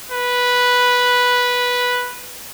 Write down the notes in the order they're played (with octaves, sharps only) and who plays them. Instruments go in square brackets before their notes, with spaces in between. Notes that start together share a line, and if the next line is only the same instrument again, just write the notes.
[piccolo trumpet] B4